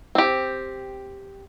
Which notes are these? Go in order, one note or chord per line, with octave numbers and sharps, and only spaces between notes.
C4 G4